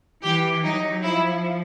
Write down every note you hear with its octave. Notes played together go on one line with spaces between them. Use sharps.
E3 G4
F#3 D#4
F3 E4